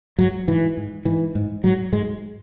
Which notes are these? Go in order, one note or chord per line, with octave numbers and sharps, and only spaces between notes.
G#2 F#3
G#2 E3
G#2
G#2 E3
G#2
G#2 F#3
G#2 G#3